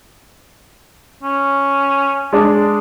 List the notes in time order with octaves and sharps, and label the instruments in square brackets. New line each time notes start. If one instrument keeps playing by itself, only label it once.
[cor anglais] C#4
[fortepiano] G#3 D4